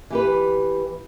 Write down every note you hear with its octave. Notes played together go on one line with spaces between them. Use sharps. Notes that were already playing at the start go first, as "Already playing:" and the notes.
E3 G4 B4